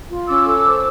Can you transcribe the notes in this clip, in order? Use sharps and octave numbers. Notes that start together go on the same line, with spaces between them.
F4
C#4 D6 E6
A4
C5